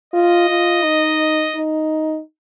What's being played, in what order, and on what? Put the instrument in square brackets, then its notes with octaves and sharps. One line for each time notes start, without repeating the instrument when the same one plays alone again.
[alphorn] F4 [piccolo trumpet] D#5
[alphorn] F4
D#4
D#4